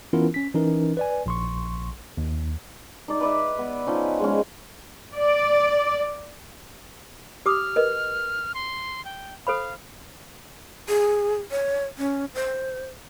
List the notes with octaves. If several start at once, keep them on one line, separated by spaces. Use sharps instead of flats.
E3 B3 C#4 E4 F4 A#4
C#4 B6
E3 C#4 D#4 A#4
B4 D5 G#5
A#1 C6 C#6
D#2
D#4 D5
B4 D5 E5
B3
F3 C#4 D#4
G#3 C#4
D5
G4 D6 D#6 F6
A#4 B4 D#5
C6
G5
A4 C5 F5 B5
G#4
C#5
C#4
C5